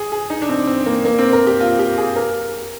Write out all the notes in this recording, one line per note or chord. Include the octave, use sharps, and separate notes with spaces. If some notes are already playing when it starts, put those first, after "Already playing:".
Already playing: G#4
G#4
D#4
D4
C4
C4
A#3
A#3
C4
A#4
G4
F4
G4
G#4
A#4